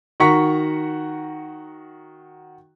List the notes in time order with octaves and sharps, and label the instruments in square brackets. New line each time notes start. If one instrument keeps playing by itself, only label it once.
[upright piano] D#3 F#4 F#5 A#5 C#6 B6